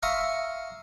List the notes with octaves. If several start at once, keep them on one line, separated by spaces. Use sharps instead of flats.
E5 F5 A#5 C6 C#6 D#6